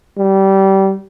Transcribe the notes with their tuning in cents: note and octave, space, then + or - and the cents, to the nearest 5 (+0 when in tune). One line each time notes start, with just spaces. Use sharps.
G3 -20